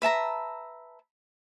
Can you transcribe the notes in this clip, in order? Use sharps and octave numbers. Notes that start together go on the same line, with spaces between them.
B4 E5 A5 A#5